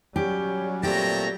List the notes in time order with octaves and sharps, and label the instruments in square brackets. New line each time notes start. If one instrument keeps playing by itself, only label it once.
[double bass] F#3 G3 [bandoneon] C#4 [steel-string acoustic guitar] G4
[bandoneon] A#2 A3 C4 [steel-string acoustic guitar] G4 [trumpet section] C#5 A5 A#5